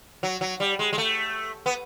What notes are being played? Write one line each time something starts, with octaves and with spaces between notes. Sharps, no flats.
F#3
F#3
G3
G#3
G#3
A3
B3